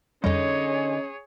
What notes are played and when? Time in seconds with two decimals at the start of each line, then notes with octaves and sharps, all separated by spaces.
0.24 F2 D3 G3 C#4 D#4 G#4 C#5